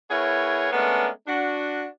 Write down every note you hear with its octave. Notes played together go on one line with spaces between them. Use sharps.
B3 E4 G#4 A#4 C#5
G#3 A3 B3 C#4 D4 A#4
D4 F#4